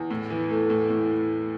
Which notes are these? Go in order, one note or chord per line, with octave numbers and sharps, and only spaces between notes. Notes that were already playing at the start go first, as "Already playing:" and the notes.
Already playing: E2
A2
E3
A3
A2
A2